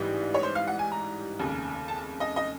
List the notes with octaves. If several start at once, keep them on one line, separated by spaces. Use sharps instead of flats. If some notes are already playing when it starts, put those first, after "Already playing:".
Already playing: A1 G#2 E3 G3
C#5
C5
F5
F#5
G#5
A#5
F1 D#2 C#3
A5
D#5
D#5